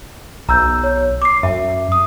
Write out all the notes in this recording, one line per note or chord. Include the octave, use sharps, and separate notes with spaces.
B1 A#5 E6 G6
C#5
D6 C7
F#2 E5
D#6